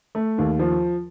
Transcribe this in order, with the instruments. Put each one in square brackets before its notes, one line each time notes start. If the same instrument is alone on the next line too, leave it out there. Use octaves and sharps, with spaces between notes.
[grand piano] A3
D#2
F3